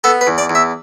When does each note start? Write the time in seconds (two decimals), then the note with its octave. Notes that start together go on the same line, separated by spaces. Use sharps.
0.04 B3 A4
0.21 B4
0.27 E2
0.38 D5
0.50 E2
0.55 E5